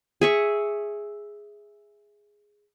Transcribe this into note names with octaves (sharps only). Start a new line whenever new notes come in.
G#4 E5 C#6